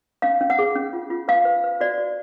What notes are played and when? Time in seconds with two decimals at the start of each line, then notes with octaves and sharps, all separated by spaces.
0.22 C#4 F5
0.41 C#4
0.50 F#5
0.59 G#4
0.76 C#4
0.93 F4
1.10 F4
1.28 B4 F5
1.45 B4
1.64 B4
1.80 F#4 D5
1.98 F#4